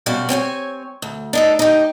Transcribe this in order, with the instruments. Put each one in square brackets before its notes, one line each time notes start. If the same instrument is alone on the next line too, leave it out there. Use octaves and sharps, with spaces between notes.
[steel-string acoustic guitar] F#2 B2 G3 F#4 F5
C4 C#5 G5 G#5
D2
D4 D#4 A4
D#4 G4